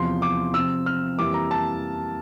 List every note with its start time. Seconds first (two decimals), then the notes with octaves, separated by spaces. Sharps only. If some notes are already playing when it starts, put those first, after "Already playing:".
Already playing: E2 C3 F3 C6
0.22 D6
0.54 C3 F3 C4 E6
0.86 F6
1.18 F2 E3 G3 A#3 D6
1.34 A#5
1.51 A5